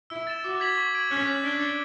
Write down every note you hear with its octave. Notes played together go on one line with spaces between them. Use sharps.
E4 E6
A6 E7
F#4 D6
G#6 B6 F#7
C#6
G#6 D7 F#7
C#4 F#6
B6 F#7
D4 G#6
C#7 F#7